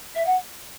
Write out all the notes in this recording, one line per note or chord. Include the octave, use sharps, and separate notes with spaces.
E5
F#5